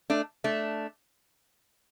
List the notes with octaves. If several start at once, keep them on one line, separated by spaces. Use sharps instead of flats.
A3 D4
A3 D4